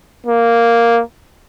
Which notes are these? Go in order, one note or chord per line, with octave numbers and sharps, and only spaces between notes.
A#3